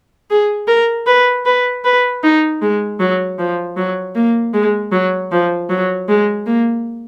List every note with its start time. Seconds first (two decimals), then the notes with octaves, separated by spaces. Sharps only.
0.30 G#4
0.68 A#4
1.06 B4
1.45 B4
1.85 B4
2.23 D#4
2.62 G#3
3.00 F#3
3.38 F3
3.77 F#3
4.15 A#3
4.53 G#3
4.92 F#3
5.31 F3
5.70 F#3
6.09 G#3
6.46 A#3